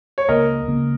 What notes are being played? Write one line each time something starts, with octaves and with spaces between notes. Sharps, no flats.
C#5
C#2 C#3 A#3 A#4 D#5
C#2 C#3 A#3